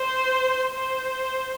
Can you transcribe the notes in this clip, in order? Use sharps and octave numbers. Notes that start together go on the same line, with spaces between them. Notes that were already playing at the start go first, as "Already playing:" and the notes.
Already playing: C5
C5